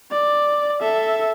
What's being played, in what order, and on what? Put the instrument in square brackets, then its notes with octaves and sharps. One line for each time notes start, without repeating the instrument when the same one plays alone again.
[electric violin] D5
A4 E5